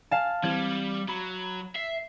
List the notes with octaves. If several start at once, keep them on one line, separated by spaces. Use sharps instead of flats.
F5 G#5 A5
E3 G3 C4 G#6
F#3 B5
E5 C7